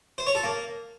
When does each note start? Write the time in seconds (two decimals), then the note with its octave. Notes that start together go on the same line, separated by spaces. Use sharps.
0.18 C5
0.27 C#5
0.35 A4
0.43 A#3